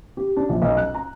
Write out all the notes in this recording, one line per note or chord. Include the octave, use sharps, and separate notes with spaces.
G4
D4
A#1
B1
F#6
A#5